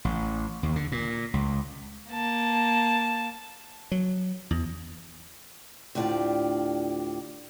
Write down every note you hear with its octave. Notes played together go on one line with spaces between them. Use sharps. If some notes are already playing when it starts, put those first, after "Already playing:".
A1
D#2
D3
A#2
C#2
A#3 A5
F#3
E2
D2 A2 D4 F4 G4 D5